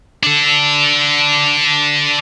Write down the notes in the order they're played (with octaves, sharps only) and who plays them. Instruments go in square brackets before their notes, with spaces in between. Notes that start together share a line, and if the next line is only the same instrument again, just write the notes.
[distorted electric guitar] D4 A4